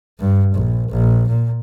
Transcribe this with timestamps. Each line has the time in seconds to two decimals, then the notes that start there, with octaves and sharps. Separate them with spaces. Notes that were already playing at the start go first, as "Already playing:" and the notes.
0.20 G2
0.54 A#1
0.90 A#1
1.29 A#2